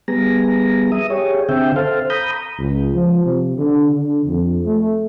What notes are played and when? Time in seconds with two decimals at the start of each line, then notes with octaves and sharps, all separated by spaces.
0.08 G3 B3 G#4 A#5
0.92 E5 D#6
1.10 G4 G#4 C#5
1.49 D3 C4 E5 G5
1.76 A4 C5 F5
2.10 A#5 B5 D#6 G6
2.59 C#2
2.94 F3
3.24 C3
3.58 D3
3.93 D3
4.25 F2
4.65 A3